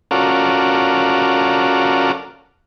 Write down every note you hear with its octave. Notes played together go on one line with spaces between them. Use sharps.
C#4 F4 F#4 A4 A#4 D5